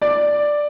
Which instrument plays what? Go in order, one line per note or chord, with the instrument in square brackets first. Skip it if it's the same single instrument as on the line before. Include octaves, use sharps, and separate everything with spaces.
[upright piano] D5